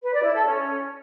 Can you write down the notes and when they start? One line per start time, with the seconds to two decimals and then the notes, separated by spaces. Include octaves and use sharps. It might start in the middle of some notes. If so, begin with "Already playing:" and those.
0.01 B4
0.12 D5
0.23 E4
0.34 A4
0.45 C#4